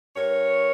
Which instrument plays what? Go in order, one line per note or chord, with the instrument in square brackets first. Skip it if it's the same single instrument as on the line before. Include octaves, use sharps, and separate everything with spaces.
[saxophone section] G2 A#4 C#5